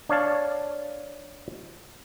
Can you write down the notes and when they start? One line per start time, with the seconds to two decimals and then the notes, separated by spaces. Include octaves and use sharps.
0.09 D4 C#5 F5 A5